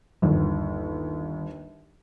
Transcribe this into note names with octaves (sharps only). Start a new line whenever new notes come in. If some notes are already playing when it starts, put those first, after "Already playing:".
G1 D#2